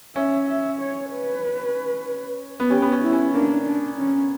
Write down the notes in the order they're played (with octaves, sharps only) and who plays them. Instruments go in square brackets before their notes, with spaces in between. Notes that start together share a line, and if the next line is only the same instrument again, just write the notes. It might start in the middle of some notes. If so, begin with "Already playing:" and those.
[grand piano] C#4 [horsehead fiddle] E5
[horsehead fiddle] E5
C#5
B4
[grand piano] B3
[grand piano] C#4 [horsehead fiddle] G4
[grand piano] B3
C#4
[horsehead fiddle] E4
[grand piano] C#4
[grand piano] A#3 [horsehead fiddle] D4
[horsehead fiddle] D4
C#4